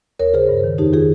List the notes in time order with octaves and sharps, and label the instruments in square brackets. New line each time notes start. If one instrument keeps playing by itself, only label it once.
[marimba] D#2 A#4 C#5
C#3 G#4 C5
G2
D#3
F2 D#4 G4
D#3 F4 G#4